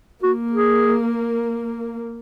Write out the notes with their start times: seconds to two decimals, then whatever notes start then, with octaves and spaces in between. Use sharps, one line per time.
0.23 A#3 F#4
0.52 G#4